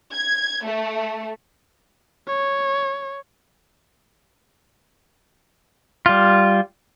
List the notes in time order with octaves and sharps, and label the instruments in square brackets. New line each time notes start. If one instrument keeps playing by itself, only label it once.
[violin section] G#6
A3
[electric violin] C#5
[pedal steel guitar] G3 F4